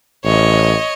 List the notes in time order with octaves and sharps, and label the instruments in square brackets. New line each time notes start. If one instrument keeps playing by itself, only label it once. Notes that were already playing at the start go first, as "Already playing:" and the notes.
[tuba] A1 [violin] C#5 D#5